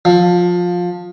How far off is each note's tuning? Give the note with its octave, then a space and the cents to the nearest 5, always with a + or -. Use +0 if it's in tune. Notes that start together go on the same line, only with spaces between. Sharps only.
F3 +20